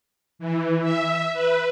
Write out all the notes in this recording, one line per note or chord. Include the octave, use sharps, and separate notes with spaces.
E3
E5
B4